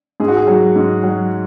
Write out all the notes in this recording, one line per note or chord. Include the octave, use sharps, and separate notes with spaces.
G#2 G#4
F#4
G#4
F#3
G#2
F#3